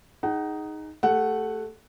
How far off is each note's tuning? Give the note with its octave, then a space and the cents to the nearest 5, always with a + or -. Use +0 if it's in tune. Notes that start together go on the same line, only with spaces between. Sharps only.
D#4 +0 G#4 +0 F#5 +30
A3 +0 G4 +30 F#5 +5